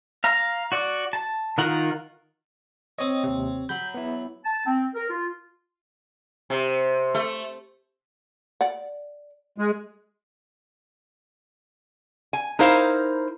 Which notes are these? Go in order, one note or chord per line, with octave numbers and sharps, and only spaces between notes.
F5 A#5
F#4 D5
A5
D#3 D#4 F4 A#4 F#5
C4 C#5 D#5 D#6
D#2 C3
F#3 B5 G6
B3 E4
A5
C4
A#4
F4
C3
A3
D5 F#5
G#3
G#5
D#4 E4 A#4 C5 F5